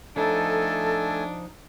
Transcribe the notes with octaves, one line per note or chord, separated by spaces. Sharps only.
F3 A3 D4 D#4 A4 G#5